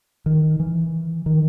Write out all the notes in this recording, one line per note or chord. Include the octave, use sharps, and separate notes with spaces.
D#3
E3
D#3